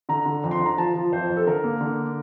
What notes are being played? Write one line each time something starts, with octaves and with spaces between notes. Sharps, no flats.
D3 A#5
D3
F2
C6
D3
A#5
F3 A5
F3
F2 C5
F2
A4
D3 A#4
A#3
D3